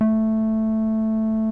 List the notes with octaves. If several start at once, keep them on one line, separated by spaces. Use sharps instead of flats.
A3